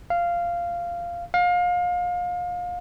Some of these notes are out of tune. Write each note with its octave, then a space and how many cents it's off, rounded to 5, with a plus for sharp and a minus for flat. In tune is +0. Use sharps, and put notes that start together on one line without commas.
F5 -10
F5 +30